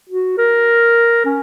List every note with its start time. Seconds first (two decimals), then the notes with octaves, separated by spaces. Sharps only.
0.09 F#4
0.38 A#4
1.25 C#4